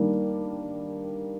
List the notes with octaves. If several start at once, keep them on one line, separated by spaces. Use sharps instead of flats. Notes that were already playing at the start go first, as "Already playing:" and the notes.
Already playing: D#3 G3 A#3 D4